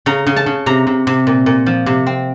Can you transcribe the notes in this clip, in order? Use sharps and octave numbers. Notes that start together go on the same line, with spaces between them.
C#3 A#5
C#3
A5
C#3
C3 A#5
C3
C3
A#2
A#2
F3
C3
C4